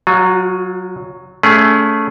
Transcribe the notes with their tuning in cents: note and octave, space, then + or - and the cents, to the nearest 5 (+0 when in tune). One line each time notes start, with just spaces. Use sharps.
F#3 +0 F4 +40
A3 +0 C#4 +30 G#4 +0